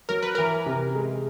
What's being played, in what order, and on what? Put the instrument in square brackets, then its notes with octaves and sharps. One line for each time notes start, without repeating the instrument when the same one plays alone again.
[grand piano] F#3 [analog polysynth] A#4
[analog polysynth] B4
[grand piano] E3 [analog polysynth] A#4
[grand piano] C3
G#3